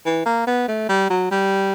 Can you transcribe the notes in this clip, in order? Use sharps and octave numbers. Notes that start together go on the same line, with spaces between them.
E3
A#3
B3
A3
G3
F#3
G3